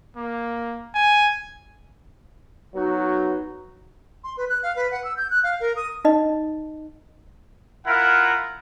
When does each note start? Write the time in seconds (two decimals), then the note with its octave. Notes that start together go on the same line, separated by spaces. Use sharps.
0.16 A#3
0.95 G#5
2.75 F#3 B3 D#4 F#4
4.24 C6
4.37 B4
4.49 F#6
4.63 F5
4.76 B4
4.92 F#5
5.04 E6
5.17 G6
5.31 F#6
5.44 F5
5.60 A#4
5.76 D#6
6.05 D#4 D#5
7.86 E4 F4 A#4 F#5